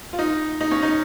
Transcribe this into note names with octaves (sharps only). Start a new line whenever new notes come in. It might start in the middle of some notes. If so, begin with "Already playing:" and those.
F4
D#4
D#4
C#4
D#4